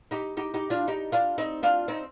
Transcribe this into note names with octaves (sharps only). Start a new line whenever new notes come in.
D#4 G4
D#4 G4
D#4 G4
D4 F4
D#4 G4
D4 F4
C4 D#4
D4 F4
C4 D#4